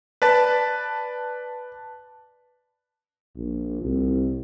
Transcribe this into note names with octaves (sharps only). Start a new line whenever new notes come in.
B4 D5 A5
A#1
C2